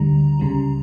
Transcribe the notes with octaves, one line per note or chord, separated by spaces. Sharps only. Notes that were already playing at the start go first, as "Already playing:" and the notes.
Already playing: D2 D3 G3 A#5
C#2 C#3 G3